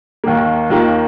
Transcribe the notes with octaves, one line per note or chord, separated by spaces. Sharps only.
D#2 D#3 A#3
D#2 D#3 A#3 F4